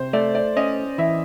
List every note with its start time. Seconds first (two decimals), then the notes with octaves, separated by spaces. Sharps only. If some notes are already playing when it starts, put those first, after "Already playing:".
Already playing: C3 C5
0.13 A3 D5
0.35 D5
0.57 C#4 D#5
0.98 E3 E5